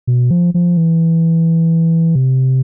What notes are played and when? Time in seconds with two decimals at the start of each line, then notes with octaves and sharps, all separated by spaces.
0.07 B2
0.31 F3
0.54 F3
0.77 E3
2.15 C3